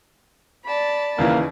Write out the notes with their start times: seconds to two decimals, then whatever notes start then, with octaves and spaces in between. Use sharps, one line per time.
0.66 D5 A5 B5
1.19 D#2 C#3 E3 A#3